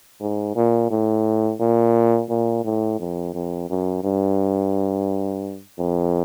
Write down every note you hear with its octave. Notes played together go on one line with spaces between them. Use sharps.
G#2
A#2
A2
A#2
A#2
A2
F2
F2
F#2
G2
F2